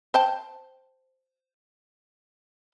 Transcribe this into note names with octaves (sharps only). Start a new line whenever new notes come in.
C5 G5 A5